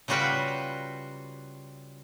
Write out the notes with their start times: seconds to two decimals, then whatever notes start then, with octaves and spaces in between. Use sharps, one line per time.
0.08 C#3 G3 F4 F#4 B4 G5